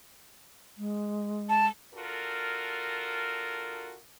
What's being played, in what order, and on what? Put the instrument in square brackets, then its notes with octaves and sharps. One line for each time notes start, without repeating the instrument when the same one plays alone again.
[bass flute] G#3
[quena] A5
[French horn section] D4 F4 F#4 A4 A#4